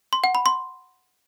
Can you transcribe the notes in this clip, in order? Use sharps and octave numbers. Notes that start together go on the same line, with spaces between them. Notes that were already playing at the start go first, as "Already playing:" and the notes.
C6
F#5
B5
C6